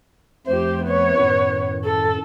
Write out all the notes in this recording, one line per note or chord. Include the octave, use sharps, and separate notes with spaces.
F2 F3 A3 G4 C5
B3 C#5
F#2 A2 D#3
A4